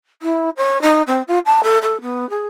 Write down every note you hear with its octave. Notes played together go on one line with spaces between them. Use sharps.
E4
C#5
D#4
C4
F4
A5
A4
A4
B3
G#4